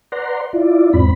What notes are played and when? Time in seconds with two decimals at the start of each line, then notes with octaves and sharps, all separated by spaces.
0.12 B4 D5 F#5 A#5 C6
0.53 E4 F4 D5
0.93 E2 G#2 C4 B5